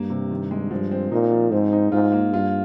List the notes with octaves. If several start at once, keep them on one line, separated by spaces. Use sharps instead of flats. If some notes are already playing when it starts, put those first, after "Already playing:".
Already playing: G2 A#3
C3
D#3
G#3
G2 F3
C4
A#2 D#4
F3
G#2 C4
D#4
G#2 F4
A#3
G2 F4